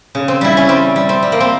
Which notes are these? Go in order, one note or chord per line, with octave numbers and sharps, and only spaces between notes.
C#3
C4
G3 E4
C#4
G3 C4
G3
C4
G3
A#3
C4